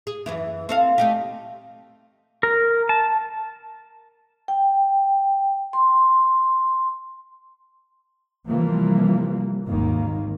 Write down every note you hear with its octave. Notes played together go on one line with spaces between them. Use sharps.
G#4
F#2 E3 E4
C4 A4 F5
A3 D#4 G4
A#4
A5
G5
C6
C3 E3 F3 G3 A#3
G#1 D#2 D#3 A#3